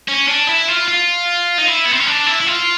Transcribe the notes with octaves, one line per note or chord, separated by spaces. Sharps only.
C#4
D4
E4
F4
F4
D#4
E4
B3
C4
C#4
D4
E4
E4
F4